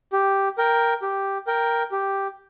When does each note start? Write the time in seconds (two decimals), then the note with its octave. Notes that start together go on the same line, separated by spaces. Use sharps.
0.13 G4
0.58 A#4 G5
1.02 G4
1.47 A#4 G5
1.92 G4